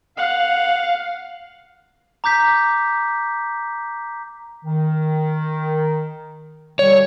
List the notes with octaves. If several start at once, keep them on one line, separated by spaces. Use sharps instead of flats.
F5 F#5
A#5 D6 G6 B6
D#3
B2 D3 G3 C#5